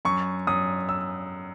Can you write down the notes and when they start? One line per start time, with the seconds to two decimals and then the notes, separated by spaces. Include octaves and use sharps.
0.05 F#2 C#6
0.47 F#2 D#6
0.89 E6